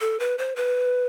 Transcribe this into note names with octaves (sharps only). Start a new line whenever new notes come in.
A4
B4
C5
B4